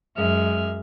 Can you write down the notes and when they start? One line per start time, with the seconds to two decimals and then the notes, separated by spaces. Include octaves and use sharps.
0.17 F#2 G#3 E5 F6